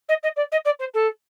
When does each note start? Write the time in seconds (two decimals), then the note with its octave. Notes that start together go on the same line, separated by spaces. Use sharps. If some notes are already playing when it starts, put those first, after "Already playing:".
0.08 D#5
0.23 D#5
0.36 D5
0.52 D#5
0.65 D5
0.79 C5
0.94 A4